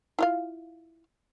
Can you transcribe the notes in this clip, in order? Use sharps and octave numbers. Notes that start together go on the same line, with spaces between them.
E4 F4 F5